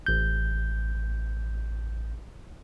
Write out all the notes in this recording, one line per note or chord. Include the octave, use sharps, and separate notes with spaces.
A1 G6